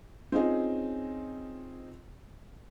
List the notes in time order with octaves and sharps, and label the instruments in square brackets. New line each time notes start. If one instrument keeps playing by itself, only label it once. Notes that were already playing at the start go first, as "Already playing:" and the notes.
[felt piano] C4 C#4 D#4 F4 G#4 D#5